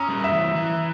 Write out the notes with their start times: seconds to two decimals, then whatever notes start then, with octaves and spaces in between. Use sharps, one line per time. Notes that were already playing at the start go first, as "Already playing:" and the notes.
Already playing: C#4 A#5 D#6 E6
0.08 G3
0.24 E5
0.32 E3
0.55 E3